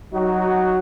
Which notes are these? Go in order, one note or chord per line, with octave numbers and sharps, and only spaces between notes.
F#3 D#4 F#4